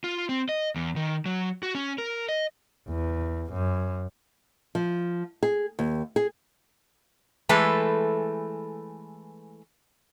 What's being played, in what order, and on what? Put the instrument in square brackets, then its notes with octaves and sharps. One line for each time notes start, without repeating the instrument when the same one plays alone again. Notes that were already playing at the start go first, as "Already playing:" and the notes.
[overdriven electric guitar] F4
C4
D#5
E2
D#3
F#3
F#4
C#4
A#4
D#5
[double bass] E2
F#2
[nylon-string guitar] F3
G#4
D#2
G#4
[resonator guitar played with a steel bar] E3 G#3 A3 A4 B4